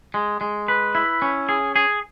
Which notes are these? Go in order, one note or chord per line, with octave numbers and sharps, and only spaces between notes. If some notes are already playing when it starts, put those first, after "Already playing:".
G#3
G#3
B4
E4
C#4
G#4
G#4